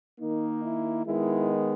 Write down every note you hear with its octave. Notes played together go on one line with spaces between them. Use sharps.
D#3 A#3 D#4
E4
D#3 G#3 B3 E4